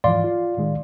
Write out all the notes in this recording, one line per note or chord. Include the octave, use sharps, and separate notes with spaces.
G#2 E3 F3 D5 F5 C6
F4
A2 D#3 G#3